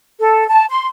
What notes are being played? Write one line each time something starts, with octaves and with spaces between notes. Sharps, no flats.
A4
A5
C6